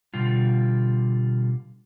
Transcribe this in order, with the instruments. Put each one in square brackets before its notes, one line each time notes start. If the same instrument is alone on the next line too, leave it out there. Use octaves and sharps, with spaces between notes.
[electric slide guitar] B2 D3 G3 F4